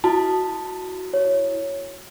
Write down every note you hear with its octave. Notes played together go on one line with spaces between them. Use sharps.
E4 F#4 A5
C#5